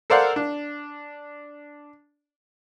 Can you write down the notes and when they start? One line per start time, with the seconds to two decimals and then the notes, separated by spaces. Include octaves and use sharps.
0.10 A4 A#4 C5 D5 F5 F#5
0.36 D4